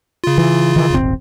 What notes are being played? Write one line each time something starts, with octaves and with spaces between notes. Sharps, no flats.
C#3 F4
E3
D#3 E3
D#1 G#1 C4